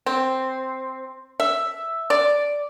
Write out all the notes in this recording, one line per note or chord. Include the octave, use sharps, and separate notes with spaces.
C4
E5
D5